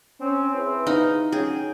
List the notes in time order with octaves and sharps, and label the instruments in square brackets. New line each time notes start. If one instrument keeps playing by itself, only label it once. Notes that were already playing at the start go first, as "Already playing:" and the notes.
[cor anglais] C4 [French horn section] C#4
[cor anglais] C4 [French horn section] E4 G#4 B4
[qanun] D#4 [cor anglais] F5
[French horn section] F#3 C#4 [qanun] G#4 [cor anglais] G5